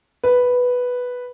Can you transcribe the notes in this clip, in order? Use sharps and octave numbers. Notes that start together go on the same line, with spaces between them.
B4